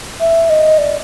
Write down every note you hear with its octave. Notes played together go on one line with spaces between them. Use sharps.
E5
D#5
D5